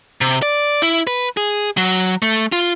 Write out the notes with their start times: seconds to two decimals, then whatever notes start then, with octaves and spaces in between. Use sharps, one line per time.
0.21 C3
0.42 D5
0.82 E4
1.07 B4
1.37 G#4
1.77 F#3
2.22 A3
2.52 F4